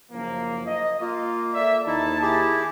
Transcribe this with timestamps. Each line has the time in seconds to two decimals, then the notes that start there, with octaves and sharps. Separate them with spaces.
0.12 F#1 F3 A#3
0.66 D#5
1.00 A#3 F4
1.54 A4 D5 E5
1.87 D#2 D#4 E4 A5
2.22 E4 G4 G#4